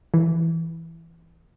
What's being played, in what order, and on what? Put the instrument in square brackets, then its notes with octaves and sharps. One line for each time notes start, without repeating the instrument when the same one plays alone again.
[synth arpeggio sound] E3